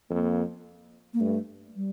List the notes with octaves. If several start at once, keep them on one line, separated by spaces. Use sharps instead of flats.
F2 A#3
A#3
G2 A3
G3